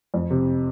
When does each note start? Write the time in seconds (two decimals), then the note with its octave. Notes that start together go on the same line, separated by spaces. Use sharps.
0.14 F2
0.30 C3